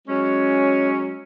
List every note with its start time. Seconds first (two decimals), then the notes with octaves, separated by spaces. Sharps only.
0.07 F#3 G#3 C#4